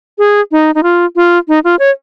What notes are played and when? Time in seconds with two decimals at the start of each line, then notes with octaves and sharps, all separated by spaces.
0.18 G#4
0.52 D#4
0.75 D#4
0.83 F4
1.16 F4
1.48 D#4
1.64 F4
1.79 C#5